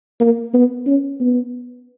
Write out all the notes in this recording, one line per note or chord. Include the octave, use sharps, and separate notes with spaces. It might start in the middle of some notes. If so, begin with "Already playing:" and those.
A#3
B3
C#4
B3